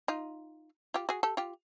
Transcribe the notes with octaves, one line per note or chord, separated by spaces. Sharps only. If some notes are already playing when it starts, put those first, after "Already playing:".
D#4 F4
F4 G4
F#4 G#4
G4 A4
F4 G4